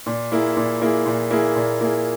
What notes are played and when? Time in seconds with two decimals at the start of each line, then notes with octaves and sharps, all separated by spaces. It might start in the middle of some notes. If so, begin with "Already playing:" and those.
0.06 A#2
0.32 A#3 E4 G#4
0.57 A#2
0.82 A#3 E4 G#4
1.06 A#2
1.31 A#3 E4 G#4
1.56 A#2
1.81 A#3 E4 G#4